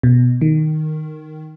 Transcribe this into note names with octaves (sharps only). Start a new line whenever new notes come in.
B2
D#3